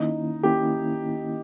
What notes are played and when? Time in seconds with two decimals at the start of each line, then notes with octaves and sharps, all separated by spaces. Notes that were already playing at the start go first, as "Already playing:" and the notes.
Already playing: D#3 A#3 C#4 D#4 E4
0.43 D#3 A#3 C#4 E4 G4